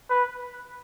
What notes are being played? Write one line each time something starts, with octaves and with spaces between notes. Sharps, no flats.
B4